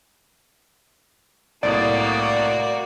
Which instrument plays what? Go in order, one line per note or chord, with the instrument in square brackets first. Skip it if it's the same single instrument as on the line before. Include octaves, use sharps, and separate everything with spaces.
[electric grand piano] C2 A2 D#6 [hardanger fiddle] A#3 F#4 [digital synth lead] D5